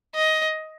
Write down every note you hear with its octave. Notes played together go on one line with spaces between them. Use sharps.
D#5